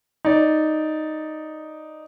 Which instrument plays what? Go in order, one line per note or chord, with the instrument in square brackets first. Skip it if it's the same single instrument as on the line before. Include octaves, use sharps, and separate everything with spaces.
[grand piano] D#4 D5